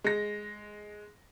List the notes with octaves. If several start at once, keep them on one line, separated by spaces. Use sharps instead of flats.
G#3 A#6